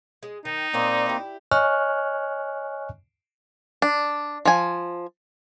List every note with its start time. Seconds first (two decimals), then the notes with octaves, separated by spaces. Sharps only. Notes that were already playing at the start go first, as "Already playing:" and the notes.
0.23 G#3
0.45 D#3 D#4
0.73 A#2 A#3 C4 D5 D#5
1.06 E4 G4
1.52 C#5 D#5 G#5 C#6 F6 F#6
3.82 D4
4.45 F3 G#5